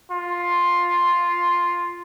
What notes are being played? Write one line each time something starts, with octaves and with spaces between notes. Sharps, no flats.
F4